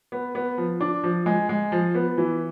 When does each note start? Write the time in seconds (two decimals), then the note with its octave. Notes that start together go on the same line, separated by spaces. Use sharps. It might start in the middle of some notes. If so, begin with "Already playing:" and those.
0.12 B3
0.35 B3
0.58 F3
0.81 D4
1.04 F3
1.26 G#3
1.49 G#3
1.72 F3
1.95 B3
2.18 E3